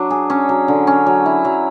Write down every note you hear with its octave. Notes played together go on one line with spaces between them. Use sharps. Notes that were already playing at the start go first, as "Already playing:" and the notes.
Already playing: F#3 D4
G#4
C#4
F#3
D3
C#4
F#3
E4
F#3